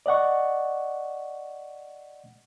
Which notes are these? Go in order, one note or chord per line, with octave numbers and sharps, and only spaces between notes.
D5 D#5 F#5 C#6